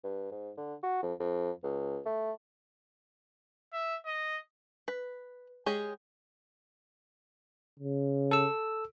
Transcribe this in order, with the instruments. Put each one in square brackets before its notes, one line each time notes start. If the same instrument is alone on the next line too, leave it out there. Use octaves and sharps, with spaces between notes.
[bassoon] G2
G#2
D3
F#4
F2
F2
C#2
A3
[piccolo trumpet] E5
D#5
[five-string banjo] B4
G#3 G4 G#4 C#5
[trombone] C#3
[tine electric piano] A4 E6